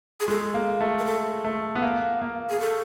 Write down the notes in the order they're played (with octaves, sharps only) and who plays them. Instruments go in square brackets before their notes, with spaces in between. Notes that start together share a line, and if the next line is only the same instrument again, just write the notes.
[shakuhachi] G#4
[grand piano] G#3 [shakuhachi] A4
[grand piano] A#3
A3
[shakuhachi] A#4
A4
[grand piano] A3
B3
A#3
A#3
[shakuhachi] G#4
A4